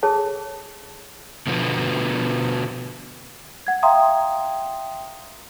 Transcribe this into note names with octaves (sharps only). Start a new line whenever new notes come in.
G#4 A4 C#5 A5
B2 D3 F3 B3
F#5 G#6
E5 F5 G5 A#5 C6 D#6